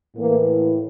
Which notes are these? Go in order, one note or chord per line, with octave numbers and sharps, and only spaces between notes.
A2 E3 A#3